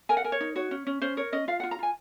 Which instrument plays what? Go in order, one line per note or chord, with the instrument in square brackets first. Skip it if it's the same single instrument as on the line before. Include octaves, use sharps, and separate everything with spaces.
[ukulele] A#4 G#5
F#5
A#4 G#5
C#5
D#4
F#4 C#5
C#4
C#4
C#4 C5
A#4 C#5
C#4 D#5
F4 F5
F#5
F4
A#5
F4 G#5